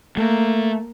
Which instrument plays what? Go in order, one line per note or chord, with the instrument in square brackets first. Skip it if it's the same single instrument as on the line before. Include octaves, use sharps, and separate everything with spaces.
[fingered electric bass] A3 [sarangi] A#3